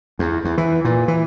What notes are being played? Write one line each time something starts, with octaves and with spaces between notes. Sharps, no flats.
E2
E2
E3
A#2
E3